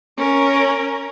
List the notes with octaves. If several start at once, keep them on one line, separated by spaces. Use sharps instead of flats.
C#4 A#4